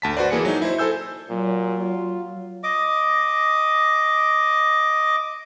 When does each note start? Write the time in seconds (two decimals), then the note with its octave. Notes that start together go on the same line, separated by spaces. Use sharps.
0.02 D2 A5 B6
0.17 F#4 B4 C5 D5
0.30 E3 A#3 G#4 G#5 C#7
0.45 F#3 D#4
0.62 E4 C5
0.79 A4 C5 G#5 E6 G6
1.29 A#2 F#3
1.82 F4
2.64 D#5 D6